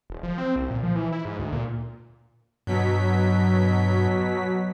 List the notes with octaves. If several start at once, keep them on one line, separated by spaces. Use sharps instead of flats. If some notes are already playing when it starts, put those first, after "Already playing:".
E1
F3
C4
C2
A#2
F3
E3
E4
G#2
D2
A#2
G2 B2 F#3 B6